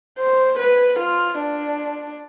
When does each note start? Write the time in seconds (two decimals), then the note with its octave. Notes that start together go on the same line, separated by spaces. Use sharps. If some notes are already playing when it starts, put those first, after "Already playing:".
0.19 C5
0.59 B4
1.00 F4
1.39 D4